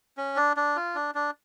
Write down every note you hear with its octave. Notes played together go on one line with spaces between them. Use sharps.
C#4
D4
D4
F4
D4
D4